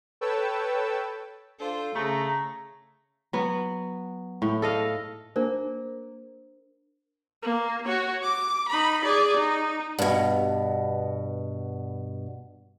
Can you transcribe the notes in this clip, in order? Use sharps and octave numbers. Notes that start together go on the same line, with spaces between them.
A4 B4 C#5 G5 A5 E6
D4 F4 A4 C5
C#3 A3 G#4 A#5
F#3 B3
A2
A4 D#5 F5
A#3 D4 A#4 C5
A#3
F#4 C#5
D6
D#4 B5
G#4 D5
D#4
G2 B2